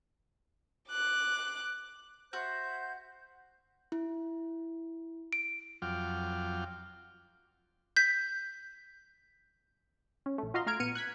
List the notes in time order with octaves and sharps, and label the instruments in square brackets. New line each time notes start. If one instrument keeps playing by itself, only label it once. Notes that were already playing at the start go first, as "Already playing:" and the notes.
[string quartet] D6 F#6
[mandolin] F#4 [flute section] C5 E5 G6
[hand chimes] E4
D7
[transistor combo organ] F2 F#3 F4 G5 D6 F6
[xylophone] G6 B6
[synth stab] C#4
A#1 A3
F4 F#4 D#5 F5 A#5 C6
A3 F5 A#5 F6 G#6 D7
A#1 B3 F6 C#7 D#7
F#6 G#6 B6